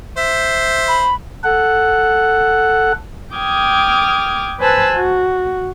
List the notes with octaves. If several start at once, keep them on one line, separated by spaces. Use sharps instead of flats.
C5 E5
B5
A4 F#5
G5 D6 D#6 F6 G#6
B4 C5 G#5 A5 E6 F#6
F#4